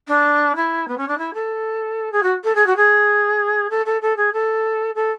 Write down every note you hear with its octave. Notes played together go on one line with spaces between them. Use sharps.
D4
E4
B3
C#4
D4
E4
A4
G#4
F#4
A4
G#4
F#4
G#4
A4
A4
A4
G#4
A4
A4